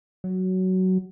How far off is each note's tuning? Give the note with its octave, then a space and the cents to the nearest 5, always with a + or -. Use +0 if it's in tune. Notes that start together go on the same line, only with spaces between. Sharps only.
F#3 +10